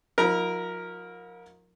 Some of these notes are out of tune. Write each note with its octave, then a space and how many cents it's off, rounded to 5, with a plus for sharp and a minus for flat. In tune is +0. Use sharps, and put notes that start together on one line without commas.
F3 +45 E4 -30 A#4 +0